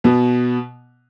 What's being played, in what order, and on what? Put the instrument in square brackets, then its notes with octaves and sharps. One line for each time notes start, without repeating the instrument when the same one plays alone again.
[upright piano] B2 B3